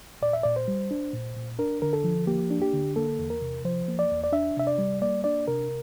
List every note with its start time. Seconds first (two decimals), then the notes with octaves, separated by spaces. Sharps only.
0.22 A#2 D5
0.33 E5
0.43 A#2 D5
0.56 C5
0.68 G3
0.91 D4
1.13 A#2
1.37 A#2
1.59 D4 A#4
1.82 D3 A#4
1.93 A4
2.04 F3
2.27 A#3 G4
2.50 D4
2.62 G4
2.73 D3
2.96 A#3 A4
3.19 E2
3.30 A#4
3.41 C3
3.65 F3 C5
3.88 A#3
3.99 D5
4.11 E2
4.24 D5
4.33 D4 E5
4.57 C3 E5
4.67 D5
4.78 G3
5.02 A#3 D5
5.24 D4 D5
5.48 C3 A#4